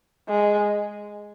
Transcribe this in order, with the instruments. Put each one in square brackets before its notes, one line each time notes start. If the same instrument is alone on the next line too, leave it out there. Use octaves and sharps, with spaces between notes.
[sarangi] G#3